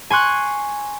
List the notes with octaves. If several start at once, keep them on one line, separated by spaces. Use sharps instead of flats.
G#5 C6 C#6 F#6